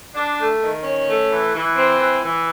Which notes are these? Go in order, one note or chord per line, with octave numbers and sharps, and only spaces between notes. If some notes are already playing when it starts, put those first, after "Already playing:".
D4
A3
D#3
C#4
A3
E3
E3
C4
E3
E3